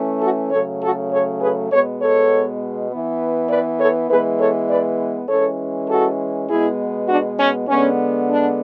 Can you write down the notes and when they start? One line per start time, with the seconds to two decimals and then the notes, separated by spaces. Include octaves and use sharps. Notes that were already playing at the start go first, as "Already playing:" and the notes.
Already playing: E3 A3 C#4
0.20 F#4 A4
0.51 C#3 F#3 A3 A4 C#5
0.80 F#4 A4
1.10 A4 C#5
1.40 G#4 B4
1.70 B2 G#3 B3 A4 C#5
2.00 A4 C#5
2.90 E3 B3
3.49 B4 D5
3.79 A4 C#5
4.09 E3 G#3 B3 G#4 B4
4.39 A4 C#5
4.69 B4 D5
5.28 E3 G#3 C#4 A4 C#5
5.88 F#4 A4
6.48 B2 G#3 B3 E4 G#4
7.08 D4 F#4
7.38 C#4
7.68 D3 G#3 B3 C#4
8.28 D4